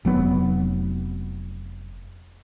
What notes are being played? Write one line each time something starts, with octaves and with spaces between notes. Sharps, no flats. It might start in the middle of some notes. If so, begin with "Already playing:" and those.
F1 F#3 B3